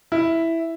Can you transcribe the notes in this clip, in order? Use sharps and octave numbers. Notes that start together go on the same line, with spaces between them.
E4